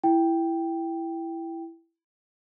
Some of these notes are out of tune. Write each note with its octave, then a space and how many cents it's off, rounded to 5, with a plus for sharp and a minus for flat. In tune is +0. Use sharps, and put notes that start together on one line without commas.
E4 +10 G5 +0